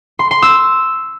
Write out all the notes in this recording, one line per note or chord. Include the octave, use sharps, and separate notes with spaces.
C6
C6
E6